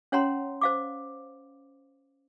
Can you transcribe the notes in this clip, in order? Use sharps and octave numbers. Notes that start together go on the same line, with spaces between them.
C#4 C#5 F#5 A#5 C6
C5 F5 D6